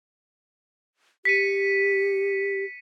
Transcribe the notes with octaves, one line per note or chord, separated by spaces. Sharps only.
G4 B6 C#7 D#7